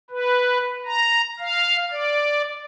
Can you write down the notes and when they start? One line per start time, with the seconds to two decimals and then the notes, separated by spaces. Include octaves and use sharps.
0.10 B4
0.86 A#5
1.39 F5
1.92 D5